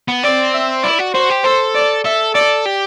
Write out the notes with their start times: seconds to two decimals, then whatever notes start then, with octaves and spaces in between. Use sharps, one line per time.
0.08 B3
0.23 C4 D5
0.53 E5
0.83 E4 D5
0.99 F#4
1.14 F#4 C5
1.30 G4
1.44 A4 C5
1.75 D5
2.04 A4 E5
2.35 A4 D5
2.66 G4